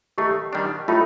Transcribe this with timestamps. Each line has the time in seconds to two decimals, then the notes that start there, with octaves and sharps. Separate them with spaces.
0.18 D#3 A3 D#4 G4
0.53 D#3 G3 D4
0.88 A2 A3 D#4 F4